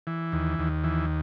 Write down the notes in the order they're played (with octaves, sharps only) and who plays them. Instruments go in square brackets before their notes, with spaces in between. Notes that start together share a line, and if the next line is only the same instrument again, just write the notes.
[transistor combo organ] E3
D#2
D#2
E3